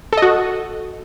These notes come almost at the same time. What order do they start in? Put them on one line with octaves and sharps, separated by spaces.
A4 D#5 F#4